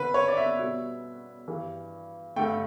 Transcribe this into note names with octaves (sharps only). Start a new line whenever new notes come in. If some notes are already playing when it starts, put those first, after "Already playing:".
Already playing: D3 B4
C#5
D5
E5
B2 G3
G2 E3 G3
G2 D3 A3 G5